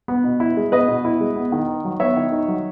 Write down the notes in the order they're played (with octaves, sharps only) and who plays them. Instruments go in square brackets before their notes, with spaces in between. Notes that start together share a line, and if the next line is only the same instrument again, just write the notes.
[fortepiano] B3
B2
E4
G#3
B3 B4 D#5
B2
E4
G#3
B3
D#3
D#4
F#3
B3 C#5 E5
D#3
D#4
F#3